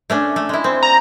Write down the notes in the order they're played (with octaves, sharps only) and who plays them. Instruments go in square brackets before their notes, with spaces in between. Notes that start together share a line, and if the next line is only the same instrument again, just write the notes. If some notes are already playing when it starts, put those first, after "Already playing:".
[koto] A3 C#4 D4
A3
G#3 E4
C4
[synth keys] A#5